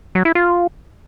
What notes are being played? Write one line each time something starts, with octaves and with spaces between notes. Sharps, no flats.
F#3
E4
F4